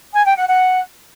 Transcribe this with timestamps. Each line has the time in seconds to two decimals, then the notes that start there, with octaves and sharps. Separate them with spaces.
0.14 G#5
0.25 G5
0.37 F#5
0.48 F#5